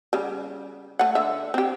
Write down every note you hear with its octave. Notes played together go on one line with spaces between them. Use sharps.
C#3 G3
A3 F#5
D3 E5
C4 G4